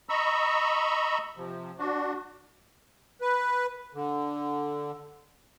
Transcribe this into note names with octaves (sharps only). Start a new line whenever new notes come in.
D#5 A#5 B5 C#6 E6
C3 F3
D4 F#4
B4
D3